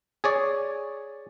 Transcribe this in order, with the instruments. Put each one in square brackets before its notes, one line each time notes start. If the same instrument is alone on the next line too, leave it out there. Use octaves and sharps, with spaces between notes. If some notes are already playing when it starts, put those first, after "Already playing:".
[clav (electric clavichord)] G#4 C#5 D5